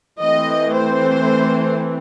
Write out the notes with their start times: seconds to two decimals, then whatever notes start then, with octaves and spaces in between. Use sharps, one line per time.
0.21 E3 A3 C4 D#5
0.76 C5